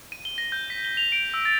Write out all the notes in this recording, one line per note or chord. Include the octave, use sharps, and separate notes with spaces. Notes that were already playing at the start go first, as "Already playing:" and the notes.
D#7
G7
A#6
G6
B6
G7
F7
D7
E6
A6